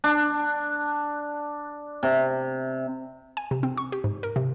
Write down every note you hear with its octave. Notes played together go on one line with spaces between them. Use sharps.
D4
C3
G#5
C3
C4
C#6
G4
G#2
A#4
C3